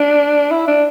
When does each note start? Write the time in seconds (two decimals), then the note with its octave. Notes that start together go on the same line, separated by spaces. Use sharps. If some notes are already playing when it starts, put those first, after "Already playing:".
Already playing: D4
0.51 E4
0.67 D4